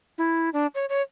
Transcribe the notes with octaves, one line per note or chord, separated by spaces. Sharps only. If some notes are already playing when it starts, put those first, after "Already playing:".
E4
D4
C#5
C#5